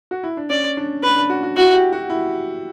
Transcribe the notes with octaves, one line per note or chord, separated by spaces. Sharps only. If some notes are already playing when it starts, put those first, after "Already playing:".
F#4
E4
D4
C#4 D5
D4
D4 B4
D4
F#4
F#4
E4 F#4
G4
F#4
E4